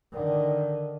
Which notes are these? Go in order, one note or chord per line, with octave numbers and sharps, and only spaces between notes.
D3 D#3